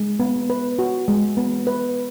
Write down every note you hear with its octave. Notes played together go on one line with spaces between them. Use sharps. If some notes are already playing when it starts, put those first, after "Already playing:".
Already playing: G#3
B3
B4
F#4
G#3
B3
B4